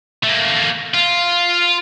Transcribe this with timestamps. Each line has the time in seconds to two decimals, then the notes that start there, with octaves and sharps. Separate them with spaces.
0.24 A3 A#3
0.94 F4